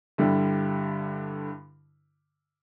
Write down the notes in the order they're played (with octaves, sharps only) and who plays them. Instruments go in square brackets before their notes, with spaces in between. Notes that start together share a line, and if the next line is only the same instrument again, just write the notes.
[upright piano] G2 D3 G3 E4